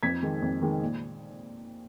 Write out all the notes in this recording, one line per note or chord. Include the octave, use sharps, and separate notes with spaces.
F2 G#6 B6
D#3 G#3
F2
D#3 G#3
A#2